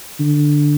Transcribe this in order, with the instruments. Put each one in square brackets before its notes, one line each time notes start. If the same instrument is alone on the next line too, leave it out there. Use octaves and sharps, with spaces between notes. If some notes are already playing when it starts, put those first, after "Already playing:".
[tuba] D3